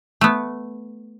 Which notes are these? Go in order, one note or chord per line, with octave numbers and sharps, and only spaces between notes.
A3 B3